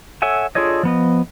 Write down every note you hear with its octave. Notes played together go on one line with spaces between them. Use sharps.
A4 C#5 E5 F#5 G#5
D4 F4 G#4 A4 C#5 D#5
F3 B3 D#5